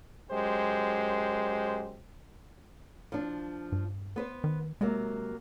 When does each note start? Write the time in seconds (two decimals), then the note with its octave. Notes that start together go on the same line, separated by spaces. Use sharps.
0.30 F#2 G#3 G4 C5
3.12 F3 D4
3.72 G2
4.16 B3 B4 C5
4.44 D#3
4.81 C3 F#3 G#3 A#3